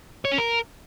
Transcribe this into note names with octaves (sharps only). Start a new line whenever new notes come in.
C#5
C#4
A#4